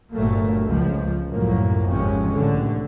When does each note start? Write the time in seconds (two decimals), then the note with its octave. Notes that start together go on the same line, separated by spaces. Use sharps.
0.13 G1 G2 A#2 F#3 A3 A#3
0.65 C#2 F3
1.30 C2 F#2 A2 F3 F#3 A#3
1.88 G#1 F2 C3 F3 G#3 C#4
2.31 C2 A2 D3 E3